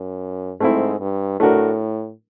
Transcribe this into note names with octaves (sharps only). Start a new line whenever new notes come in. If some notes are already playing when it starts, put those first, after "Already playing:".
Already playing: F#2
G#2 A3 C4 E4
G2
A2 A3 D4 F#4 A#4